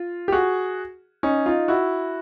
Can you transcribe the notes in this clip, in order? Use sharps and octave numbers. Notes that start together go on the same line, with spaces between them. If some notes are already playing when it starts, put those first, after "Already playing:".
Already playing: F4
G4
F#4 G#4
C#4 D#4
D#4 F4
E4 F#4